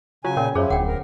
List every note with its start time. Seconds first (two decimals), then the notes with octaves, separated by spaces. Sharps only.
0.25 C#3 F#3 F4 G#5
0.37 A#2 C#4 A#4
0.55 F#2 F3 E4 G#4 C5 C#5
0.70 D1 F#5 G5
0.87 A#4